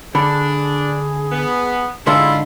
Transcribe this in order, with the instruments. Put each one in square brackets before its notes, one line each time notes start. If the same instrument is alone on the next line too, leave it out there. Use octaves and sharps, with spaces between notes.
[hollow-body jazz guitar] D3 [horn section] D4 [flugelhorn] G#4 [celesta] B5
[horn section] B3
[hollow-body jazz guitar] G#2 D3 D4 [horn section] E4 F4 [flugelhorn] G#4 [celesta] C6 E6